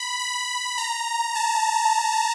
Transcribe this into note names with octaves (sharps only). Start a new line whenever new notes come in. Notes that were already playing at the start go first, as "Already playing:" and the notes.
Already playing: B5
B5
A#5
A5